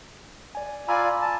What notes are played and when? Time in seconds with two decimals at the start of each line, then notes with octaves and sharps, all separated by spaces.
0.55 D5 G#5
0.88 F4 D5 G#5 A#5 B5 E6
1.21 A5